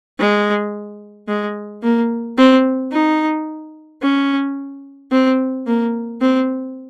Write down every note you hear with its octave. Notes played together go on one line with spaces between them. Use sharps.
G#3
G#3
A#3
C4
D#4
C#4
C4
A#3
C4